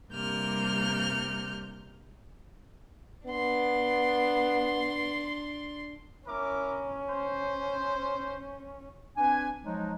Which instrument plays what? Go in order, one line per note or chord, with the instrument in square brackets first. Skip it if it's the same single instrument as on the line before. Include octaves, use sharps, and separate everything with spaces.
[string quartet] G2 C3 G3 A#3 F6 G6
[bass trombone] B3 [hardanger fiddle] D4 C6
[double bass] C#4 [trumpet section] E4 A#4 D6
[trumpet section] C5
[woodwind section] C4 D4 B4 G#5
F3 F#3 G#3 D#4